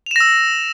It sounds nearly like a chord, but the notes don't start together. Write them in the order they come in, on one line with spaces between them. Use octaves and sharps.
F7 E7 A#6 E6